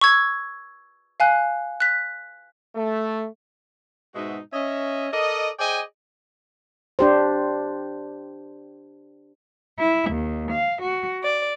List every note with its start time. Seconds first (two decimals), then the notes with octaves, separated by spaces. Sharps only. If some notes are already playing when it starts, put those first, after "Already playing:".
0.01 C#6 E6 G#6
1.20 F5 G#5 F#6
1.80 F#6 B6
2.76 A3
4.14 G#2 B2 G#3 D#4 F#4 E5
4.53 C#4 D#5 E5
5.12 A4 A#4 D5 D#5
5.59 G#4 C5 D5 D#5 G5 G#5
6.99 D4 G4 C5
9.79 E4
10.11 D#2
10.51 F5
10.82 F#4
11.23 D5